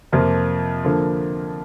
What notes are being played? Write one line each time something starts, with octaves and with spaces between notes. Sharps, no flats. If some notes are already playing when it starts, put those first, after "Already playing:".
F2 C3 F3 A#3
D3 F3 A#3